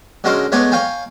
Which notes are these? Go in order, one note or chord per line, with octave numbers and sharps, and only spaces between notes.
D3 G#3 C#4 F#4 A#4 C6
G#3 A3 B3 C#5 D5 G#5
C#5 F5 G5 G#5 A#5